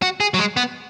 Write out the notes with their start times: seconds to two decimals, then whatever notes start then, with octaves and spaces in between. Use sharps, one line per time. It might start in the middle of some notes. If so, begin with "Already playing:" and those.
0.02 F#4
0.20 G#4
0.34 F#3
0.39 G#3
0.57 B3